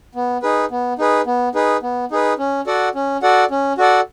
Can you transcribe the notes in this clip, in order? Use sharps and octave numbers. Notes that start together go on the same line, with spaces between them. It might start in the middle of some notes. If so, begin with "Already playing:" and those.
B3
D#4 G#4 B4
B3
D#4 G#4 B4
B3
D#4 G#4 B4
B3
D#4 G#4 B4
C#4
F#4 A4 D5 F#5
C#4
F#4 A4 D5 F#5
C#4
F#4 A4 D5 F#5